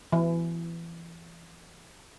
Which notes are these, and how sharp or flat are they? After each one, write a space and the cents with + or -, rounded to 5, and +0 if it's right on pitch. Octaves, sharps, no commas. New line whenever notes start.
E3 +30